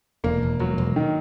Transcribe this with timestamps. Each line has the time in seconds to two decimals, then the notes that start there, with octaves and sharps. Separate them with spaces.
0.24 E1 A#3
0.43 E1
0.59 E1 F#3
0.78 E1
0.96 D#3